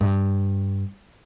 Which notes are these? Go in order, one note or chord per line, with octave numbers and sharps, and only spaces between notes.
G2